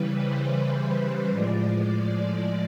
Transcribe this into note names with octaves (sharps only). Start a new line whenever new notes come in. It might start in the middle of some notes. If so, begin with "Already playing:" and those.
Already playing: C#3 E3 G3 B4
C5
A2 F3 G#3 D5